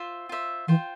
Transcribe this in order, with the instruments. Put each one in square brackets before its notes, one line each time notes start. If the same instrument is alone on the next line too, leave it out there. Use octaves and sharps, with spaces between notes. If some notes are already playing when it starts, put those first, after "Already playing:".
Already playing: [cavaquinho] F4 C5 E5
F4 C5 E5
[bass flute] E3 [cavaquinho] F4 C5 G5